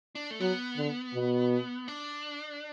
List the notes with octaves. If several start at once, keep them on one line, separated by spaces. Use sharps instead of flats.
D4
A3
F#3 B3
D3
B2
D4